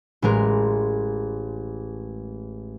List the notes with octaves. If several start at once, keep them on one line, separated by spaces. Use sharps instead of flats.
A1 G#3 A#4